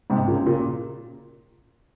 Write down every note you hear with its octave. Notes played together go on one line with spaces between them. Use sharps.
G#2 C3
A#2 C#3
A#2 C#3